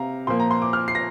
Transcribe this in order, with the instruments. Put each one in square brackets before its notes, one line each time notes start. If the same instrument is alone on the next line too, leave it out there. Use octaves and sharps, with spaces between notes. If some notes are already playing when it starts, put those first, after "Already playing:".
Already playing: [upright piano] C3 F5 A#5
A#2 F3 A#3 C6
A#5
C6
D6
F6
C7
A#6